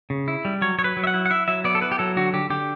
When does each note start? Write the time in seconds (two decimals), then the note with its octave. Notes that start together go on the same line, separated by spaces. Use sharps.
0.10 C#3
0.28 E4
0.45 G3
0.62 F#3 C#5
0.79 F#3 C#5
0.84 B4
0.97 F#3
1.04 E5
1.07 F#5
1.14 E4
1.26 F#5
1.30 E4 E5
1.48 F#3 E5
1.64 B3 D5
1.75 A4
1.82 E4 B4
1.92 G4
1.99 F#3 A4
2.17 D3 F#4
2.33 D3 G4
2.50 D3 G4